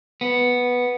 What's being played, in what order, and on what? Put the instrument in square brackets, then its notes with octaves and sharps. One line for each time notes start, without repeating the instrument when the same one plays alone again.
[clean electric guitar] B3